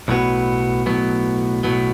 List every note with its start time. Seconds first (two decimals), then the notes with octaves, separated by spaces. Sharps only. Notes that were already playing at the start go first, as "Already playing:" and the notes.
0.08 B1 A2 F#3 B3
0.86 B1 A2 F#3 B3
1.63 B1 A2 F#3 B3